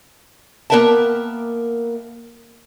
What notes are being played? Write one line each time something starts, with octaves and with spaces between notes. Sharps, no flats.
A#3 B3 A#4 E5 G5 A5